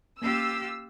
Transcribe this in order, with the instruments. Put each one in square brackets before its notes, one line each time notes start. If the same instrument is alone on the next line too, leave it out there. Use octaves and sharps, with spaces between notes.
[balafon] A#3 C#4 [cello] F4 G4 [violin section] E6